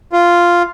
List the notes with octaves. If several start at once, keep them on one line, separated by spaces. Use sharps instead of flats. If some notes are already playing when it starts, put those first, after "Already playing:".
F4